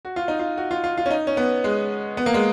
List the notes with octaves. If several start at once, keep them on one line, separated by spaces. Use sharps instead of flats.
F#4
F4
D#4
F4
F#4
F4
F4
F4
C#4
D#4
C#4
B3
G#3
B3
A#3
G#3